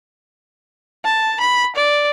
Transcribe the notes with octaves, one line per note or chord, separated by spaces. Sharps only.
A5
B5
D5